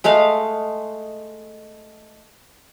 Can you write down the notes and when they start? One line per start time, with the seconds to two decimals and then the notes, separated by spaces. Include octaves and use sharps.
0.04 G#3 A3 D#5 F5